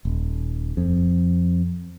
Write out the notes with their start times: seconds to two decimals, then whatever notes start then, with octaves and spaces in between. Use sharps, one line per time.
0.05 D#1
0.77 F2